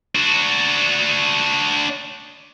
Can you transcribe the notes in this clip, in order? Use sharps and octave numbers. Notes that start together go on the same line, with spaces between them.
D4 F#4